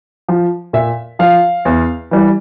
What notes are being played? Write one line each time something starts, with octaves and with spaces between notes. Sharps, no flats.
F3
A#2 E5
F3 F5
E2
E3 G3